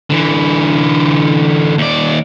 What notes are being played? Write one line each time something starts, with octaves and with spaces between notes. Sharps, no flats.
D3 E3
D#2 D5